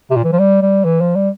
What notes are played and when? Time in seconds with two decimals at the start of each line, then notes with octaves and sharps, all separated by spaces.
0.10 C3
0.16 A#2
0.24 E3
0.32 F3
0.39 G3
0.62 G3
0.85 E3
1.01 F3
1.15 G3